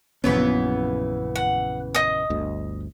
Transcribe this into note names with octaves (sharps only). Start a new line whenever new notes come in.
A#1 F#2 C#3 E3 B3 C#4
F#5
D#5 D#6
G1 D2